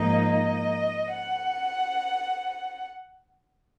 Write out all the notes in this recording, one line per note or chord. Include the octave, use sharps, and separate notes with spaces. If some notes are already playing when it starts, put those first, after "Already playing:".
Already playing: G#2 F3 A#3 D#4 D#5
D#5
F#5